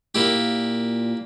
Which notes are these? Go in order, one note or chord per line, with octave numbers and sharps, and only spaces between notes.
A#2 A#3 E4 G4